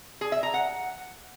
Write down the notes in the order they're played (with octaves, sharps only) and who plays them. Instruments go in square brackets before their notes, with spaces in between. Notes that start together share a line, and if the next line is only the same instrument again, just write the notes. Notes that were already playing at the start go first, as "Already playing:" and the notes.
[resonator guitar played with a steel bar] G#4
E5
A#5
F#5